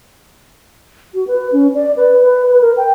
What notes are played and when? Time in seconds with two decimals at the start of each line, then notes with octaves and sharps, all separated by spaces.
1.14 F#4
1.27 B4
1.52 C#4
1.75 D5
1.97 B4
2.21 B4
2.49 B4
2.61 A#4
2.77 G5